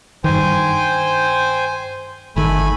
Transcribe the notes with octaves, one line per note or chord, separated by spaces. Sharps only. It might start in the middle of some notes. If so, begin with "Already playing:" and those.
G2 D#3 C5 G5 G#5
G1 D#3 A3 G#5 B5